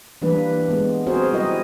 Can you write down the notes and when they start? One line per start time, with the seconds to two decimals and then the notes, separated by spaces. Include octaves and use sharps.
0.22 E3 G3 A#3 D4 B4
0.68 G#3 B3
1.06 C4 F#4 G#4 A#4 C5
1.32 G3 E4 A#4 D#5